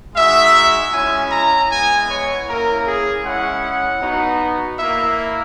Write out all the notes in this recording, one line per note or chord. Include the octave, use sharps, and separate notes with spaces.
G#3 D#4 F#4 E5
G#3 C#4 E4 G#5
A#5
G#3 B3 E4 G#5
C#5
A#3 C#4 E4 A#4
G#4
G#3 C#4 E4 F#5
B3 D#4 F#4
A#3 E4 E5